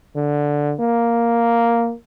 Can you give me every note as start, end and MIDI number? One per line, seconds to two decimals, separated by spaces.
0.16 0.74 50
0.80 1.93 58